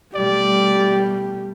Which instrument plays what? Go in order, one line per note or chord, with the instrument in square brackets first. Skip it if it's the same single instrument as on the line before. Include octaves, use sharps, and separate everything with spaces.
[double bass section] B2 G3 A3 [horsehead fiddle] G4 [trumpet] D5